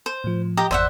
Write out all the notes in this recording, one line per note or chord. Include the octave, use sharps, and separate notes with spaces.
C5
A2 F3
G4 D#5 A#5
G1 E2 C5 D5 E5 F#5